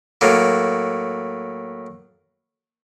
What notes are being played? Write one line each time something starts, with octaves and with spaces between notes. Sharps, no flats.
A2 F#3 A#3